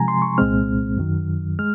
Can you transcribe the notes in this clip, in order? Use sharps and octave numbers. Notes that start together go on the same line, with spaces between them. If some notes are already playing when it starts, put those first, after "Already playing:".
Already playing: C3 F3 G#3 G#5 A#5
C6
C#6
C2 A#2 G#3 C4 F6
F#2 D#3 F#3
G#3 F6